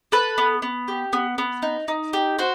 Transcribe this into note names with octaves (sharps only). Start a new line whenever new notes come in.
A4 B4
B3
B3
G4
B3
B3
D#4
D#4
G4
F#4 C5